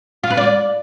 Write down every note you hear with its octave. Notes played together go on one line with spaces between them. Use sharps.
F4
B4
D5